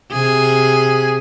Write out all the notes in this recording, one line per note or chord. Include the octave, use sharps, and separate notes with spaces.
C3 G#4